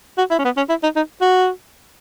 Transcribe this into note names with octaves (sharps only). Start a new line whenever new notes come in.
F#4
E4
C#4
B3
C#4
E4
D#4
D#4
F#4